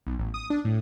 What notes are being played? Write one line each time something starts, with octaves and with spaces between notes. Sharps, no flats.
B1
A1
D#6
D4
A2